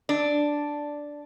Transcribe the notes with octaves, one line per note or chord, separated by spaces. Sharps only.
D4